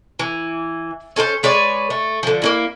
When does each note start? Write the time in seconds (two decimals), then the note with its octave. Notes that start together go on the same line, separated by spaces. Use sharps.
0.19 E3
1.16 C#4 A4 A#4 C5
1.43 G#3 B4 C#5 D5
1.90 A3
2.23 D3 F3
2.42 A#3 C#4 E4